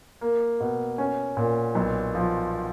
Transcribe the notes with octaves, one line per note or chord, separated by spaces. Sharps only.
A#3
B2
C#4
A#2
B1
F3